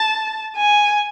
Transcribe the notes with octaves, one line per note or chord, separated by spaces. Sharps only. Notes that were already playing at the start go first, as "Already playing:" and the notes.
Already playing: A5
G#5